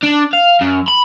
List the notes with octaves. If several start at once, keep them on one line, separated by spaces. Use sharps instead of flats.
D4
F5
F#2
B5